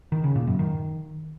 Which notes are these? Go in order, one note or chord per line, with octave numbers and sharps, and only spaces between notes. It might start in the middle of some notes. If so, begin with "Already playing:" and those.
D#3
C#3
A#2
F#2
D#3